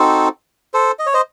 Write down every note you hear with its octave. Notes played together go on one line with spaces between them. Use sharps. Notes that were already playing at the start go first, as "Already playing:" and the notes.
Already playing: C4 D#4 F#4 A4 C5
A4 C5
D#5
C#5
C5 D#5